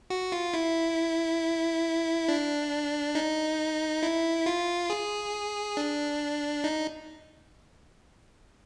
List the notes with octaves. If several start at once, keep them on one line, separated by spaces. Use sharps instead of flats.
F#4
F4
E4
D4
D#4
E4
F4
G#4
D4
D#4